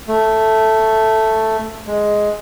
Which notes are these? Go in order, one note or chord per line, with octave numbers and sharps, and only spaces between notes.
A3
G#3